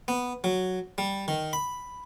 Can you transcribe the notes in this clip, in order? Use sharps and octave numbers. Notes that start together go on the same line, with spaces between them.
B3
F#3
G3
D#3
B5